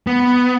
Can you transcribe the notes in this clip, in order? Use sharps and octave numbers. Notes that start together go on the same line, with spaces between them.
B3